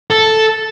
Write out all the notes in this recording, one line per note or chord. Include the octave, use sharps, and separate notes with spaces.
A4